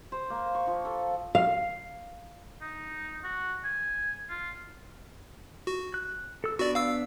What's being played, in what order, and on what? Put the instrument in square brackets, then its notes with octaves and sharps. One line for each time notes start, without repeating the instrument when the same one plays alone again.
[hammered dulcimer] C5
A#3
C#6
F3
A4
[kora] F5
[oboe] D#4
F#4
G#5
F4
[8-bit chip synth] F#4
[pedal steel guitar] F#6
A4 E6
[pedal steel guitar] B3 D4 [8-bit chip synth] F#4 D5
[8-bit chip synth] F5 E6